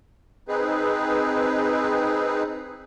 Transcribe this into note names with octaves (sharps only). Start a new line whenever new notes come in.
C4 D#4 G#4 B4